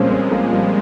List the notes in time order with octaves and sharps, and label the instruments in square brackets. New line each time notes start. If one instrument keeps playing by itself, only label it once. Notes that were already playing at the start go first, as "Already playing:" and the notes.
Already playing: [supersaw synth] A#2 F3 G#3 [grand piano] G3 A#3 C4 C#4
[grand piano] C4
A#3
G3